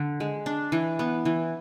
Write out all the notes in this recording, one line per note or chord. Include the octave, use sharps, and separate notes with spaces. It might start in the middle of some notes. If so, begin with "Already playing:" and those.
Already playing: D3
G#3
D4
E3
B3
E3